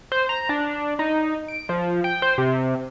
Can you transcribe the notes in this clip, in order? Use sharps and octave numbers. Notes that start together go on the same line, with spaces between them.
C5
A#5
D4
D#4
D7
F3
G5
C5
C3